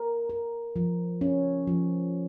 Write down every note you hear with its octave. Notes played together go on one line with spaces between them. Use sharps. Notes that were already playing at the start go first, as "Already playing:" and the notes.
Already playing: A#4
A#4
F3
C#4
F3